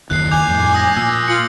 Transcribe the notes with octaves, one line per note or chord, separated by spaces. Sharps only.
F#1 D#2 F#6 C7
G#5 D6 G6 F7
F2 A2
D6 D#6 A#6
A#2 E6
F4 C#7 F#7